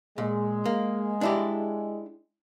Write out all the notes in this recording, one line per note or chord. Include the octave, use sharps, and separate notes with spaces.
A#2 G#3
A#3
D4 E4 G4